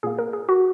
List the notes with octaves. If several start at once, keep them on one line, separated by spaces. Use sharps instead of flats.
A#2 A#3 G#4
A#4
G#4
F#4